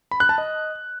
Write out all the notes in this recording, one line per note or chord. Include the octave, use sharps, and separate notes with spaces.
B5
F#6
A5
D#5